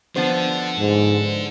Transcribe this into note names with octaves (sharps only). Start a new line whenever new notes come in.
D3 F3 B3 C5
G#2